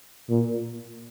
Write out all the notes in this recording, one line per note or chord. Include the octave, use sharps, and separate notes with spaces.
A#2